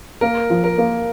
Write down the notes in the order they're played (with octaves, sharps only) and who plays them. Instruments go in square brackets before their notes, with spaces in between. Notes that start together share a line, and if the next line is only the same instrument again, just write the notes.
[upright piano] A#3 [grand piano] A#4
[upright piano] F3
[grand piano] A#4
[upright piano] A#3